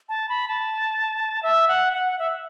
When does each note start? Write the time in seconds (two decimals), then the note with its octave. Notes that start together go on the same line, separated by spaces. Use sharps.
0.09 A5
0.29 B5
0.48 A5
1.43 E5
1.68 F#5
1.93 F#5
2.19 E5